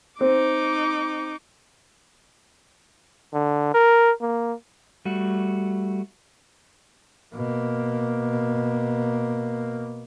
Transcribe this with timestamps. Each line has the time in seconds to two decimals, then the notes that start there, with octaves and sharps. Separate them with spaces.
0.21 C4 D#4 D6
3.34 D3
3.74 A#4
4.22 A#3
5.05 G3 A3 F#4
7.35 B2 A#3